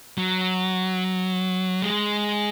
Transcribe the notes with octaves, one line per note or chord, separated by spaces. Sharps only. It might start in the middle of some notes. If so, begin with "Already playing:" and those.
F#3
G#3